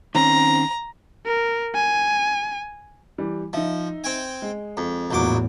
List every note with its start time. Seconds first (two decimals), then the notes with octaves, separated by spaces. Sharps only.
0.15 D#3 C4 C#4 A#5
1.26 A#4
1.75 G#5
3.18 E3 G3
3.53 F3 D#4 E5
4.04 C4 G5 G#5
4.42 G#3
4.77 F2
5.11 A#1 E2 A2 F#3 D6